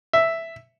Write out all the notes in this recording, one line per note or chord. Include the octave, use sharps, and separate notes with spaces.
E5